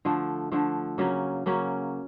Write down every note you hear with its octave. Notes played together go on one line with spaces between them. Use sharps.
D3 F3 A3
D3 F3 A3
C#3 F#3 A#3 C#4
C#3 F#3 A#3 C#4